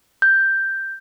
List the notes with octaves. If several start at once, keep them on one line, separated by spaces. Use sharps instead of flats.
G6